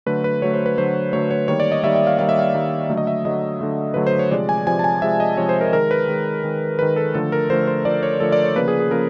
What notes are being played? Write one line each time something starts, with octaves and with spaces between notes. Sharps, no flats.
D3 F#3 A3 B4
B4
D3 F#3 A3 C#5
C5
B4
D3 F#3 A3 C5
D3 F#3 A3 C#5
C#5
D#3 G3 A#3 C#5
D5
D#5
D#3 G3 A#3 E5
E5
F5
D#3 G3 A#3 F5
E5
F5
D#3 G3 A#3
D3 F#3 A3
D#5
E5
D3 F#3 A3 D#5
D3 F#3 A3
D3 F#3 A3 B4
C5
C#5
C3 F3 G#3 D5
G#5
C3 F3 G#3 G#5
A5
G#5
C3 F3 G#3 E5
D#5
C3 F3 G#3 C#5
C5
A#4
D#3 G#3 A#4
B4
D#3 G#3
D#3 G#3
D#3 G#3 B4
A4
D3 F3 A3 A4
A#4
D3 F3 A3 C5
C5
D3 F3 A3 D5
C#5
D3 F3 A3 A4
D5
C#5
C#3 F3 A#3 B4
G#4
G#4
C#3 F3 A#3 A#4